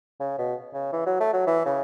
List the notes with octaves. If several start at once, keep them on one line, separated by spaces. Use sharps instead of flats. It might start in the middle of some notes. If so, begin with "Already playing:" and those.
C#3
B2
C#3
E3
F#3
A3
F#3
E3
C#3